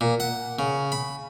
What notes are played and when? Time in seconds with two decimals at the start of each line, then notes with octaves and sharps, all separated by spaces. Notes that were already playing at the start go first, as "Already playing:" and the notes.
0.01 A#2
0.20 F#5
0.59 C#3
0.92 B5